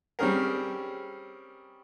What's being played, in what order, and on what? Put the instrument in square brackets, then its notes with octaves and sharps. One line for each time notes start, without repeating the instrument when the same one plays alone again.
[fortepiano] G3 C4 C#4 G#4 A#4